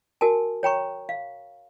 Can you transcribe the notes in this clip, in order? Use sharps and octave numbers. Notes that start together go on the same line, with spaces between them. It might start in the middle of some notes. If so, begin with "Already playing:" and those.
F#4 A#4 G#5 A5
C#5 G5 A#5 C#6
F5